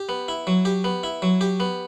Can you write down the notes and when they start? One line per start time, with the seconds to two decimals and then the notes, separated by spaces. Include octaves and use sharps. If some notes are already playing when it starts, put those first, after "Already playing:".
Already playing: G4
0.09 B3
0.28 E4
0.47 F#3
0.65 G4
0.84 B3
1.04 E4
1.22 F#3
1.41 G4
1.60 B3